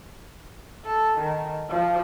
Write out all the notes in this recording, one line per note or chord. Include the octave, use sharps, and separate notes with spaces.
A4
D#3
F3